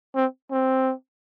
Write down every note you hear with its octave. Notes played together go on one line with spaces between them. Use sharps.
C4
C4